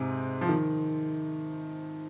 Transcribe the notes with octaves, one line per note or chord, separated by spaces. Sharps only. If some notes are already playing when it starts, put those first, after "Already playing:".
Already playing: G#2 C3
F3
D#3